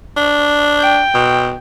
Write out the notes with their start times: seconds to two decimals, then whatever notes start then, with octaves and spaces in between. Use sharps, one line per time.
0.17 D4
0.80 G5
1.14 B2